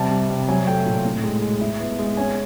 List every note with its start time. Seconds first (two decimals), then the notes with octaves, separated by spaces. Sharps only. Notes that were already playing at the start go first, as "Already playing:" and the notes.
Already playing: C3 G3 A5
0.11 G3
0.30 C3
0.48 F#3 G#5
0.67 A3 G5
0.86 A#2
1.05 A2
1.24 G#3
1.42 G#3
1.61 E4
1.80 B3
1.99 G#3
2.17 C#4 G#5